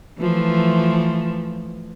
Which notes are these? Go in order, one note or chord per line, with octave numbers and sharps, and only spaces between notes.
E3 F3 A3